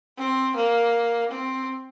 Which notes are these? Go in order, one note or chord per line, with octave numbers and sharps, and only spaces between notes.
C4
A#3
C4